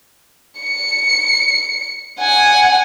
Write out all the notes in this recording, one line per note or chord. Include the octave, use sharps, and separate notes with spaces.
C#7
F#5 G#5